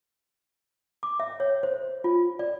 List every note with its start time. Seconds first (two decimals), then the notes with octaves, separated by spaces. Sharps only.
1.03 D6
1.20 E5
1.40 C#5
1.63 C5
2.04 F4
2.39 D5